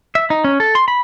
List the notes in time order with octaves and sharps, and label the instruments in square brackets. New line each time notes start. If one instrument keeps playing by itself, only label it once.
[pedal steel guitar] E5
D#4
C#4
A4
C6
B5